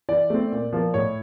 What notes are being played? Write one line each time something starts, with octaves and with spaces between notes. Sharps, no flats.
E3 D5
A3 C4
A#2
F3 A#3
A2 C#5